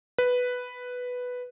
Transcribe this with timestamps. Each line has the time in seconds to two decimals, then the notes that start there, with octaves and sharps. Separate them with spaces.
0.18 B4